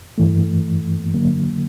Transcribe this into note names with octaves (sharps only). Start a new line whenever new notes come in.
G2 E3 A3
D3 F#3 A#3